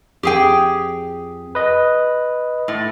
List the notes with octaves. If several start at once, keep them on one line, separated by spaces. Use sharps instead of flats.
F2 G4 G#4 G5
B4 D#5
A2